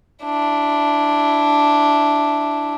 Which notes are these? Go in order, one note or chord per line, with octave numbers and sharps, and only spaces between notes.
D4 E4